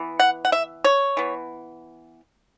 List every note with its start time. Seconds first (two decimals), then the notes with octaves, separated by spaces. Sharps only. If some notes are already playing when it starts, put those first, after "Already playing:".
Already playing: E3 B3
0.20 F#5
0.45 F#5
0.52 E5
0.84 C#5
1.17 E3 B3